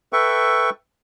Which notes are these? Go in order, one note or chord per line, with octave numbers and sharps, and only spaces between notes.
A4 B4 E5 G5 C#6